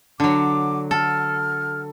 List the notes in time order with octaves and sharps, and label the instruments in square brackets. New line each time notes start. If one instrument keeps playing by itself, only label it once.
[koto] D3 F#3 [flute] D6
[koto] A4 [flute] F6